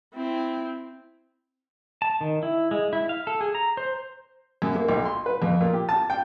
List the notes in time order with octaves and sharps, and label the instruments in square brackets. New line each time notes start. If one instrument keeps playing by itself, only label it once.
[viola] C4 E4
[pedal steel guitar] A5
D#3
E4
G#3
E4
F5
A4
G#4
A#5
C5
[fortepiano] F#2
A#3
B1
C6
B4
F2
A#2
G4
A5
G5